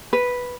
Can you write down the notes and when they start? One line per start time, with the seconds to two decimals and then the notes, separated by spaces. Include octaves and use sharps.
0.13 B4